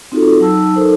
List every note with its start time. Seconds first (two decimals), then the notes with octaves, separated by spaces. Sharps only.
0.12 C4 D#4 F4 F#4 G#4 A4
0.40 F#3 D#4 A5 E6
0.76 D#4 A4 A#4 C5